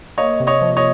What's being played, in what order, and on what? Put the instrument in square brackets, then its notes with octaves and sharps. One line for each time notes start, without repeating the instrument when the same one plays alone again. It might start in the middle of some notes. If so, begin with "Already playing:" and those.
[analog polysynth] A#3 [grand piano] C#5 D#5
[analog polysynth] C3
[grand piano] C#5 D#5
[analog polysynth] F3
[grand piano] C#5 D#5